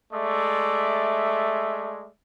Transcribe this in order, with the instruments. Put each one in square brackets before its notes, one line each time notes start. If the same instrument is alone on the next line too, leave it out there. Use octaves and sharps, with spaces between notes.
[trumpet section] G#3 A3 D5 E5